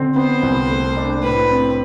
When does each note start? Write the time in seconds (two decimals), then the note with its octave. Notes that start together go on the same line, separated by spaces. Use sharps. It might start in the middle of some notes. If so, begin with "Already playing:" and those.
Already playing: D3 C4
0.16 B3 C5
0.43 C2
0.69 A3
0.97 D4
1.23 A2 B4
1.49 C4